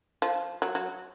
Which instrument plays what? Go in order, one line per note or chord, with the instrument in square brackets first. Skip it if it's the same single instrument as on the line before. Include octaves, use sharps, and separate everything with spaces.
[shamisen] F3
F#3
F#3